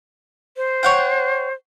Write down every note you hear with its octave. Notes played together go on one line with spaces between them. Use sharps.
C5
C#5 F#5 G5